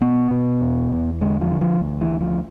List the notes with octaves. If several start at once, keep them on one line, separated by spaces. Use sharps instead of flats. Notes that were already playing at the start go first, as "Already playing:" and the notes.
B2 B3
B2
E2
E2
D3 G#3
F3
D3
F3
D2
E3
D2
F3